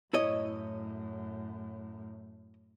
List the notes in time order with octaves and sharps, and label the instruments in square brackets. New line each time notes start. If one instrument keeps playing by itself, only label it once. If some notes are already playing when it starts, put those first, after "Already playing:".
[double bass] F#2 A2 [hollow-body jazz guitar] E4 C#5 D#5